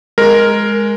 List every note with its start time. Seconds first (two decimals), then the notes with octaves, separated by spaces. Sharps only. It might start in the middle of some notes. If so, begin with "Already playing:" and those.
0.18 G#3 A#4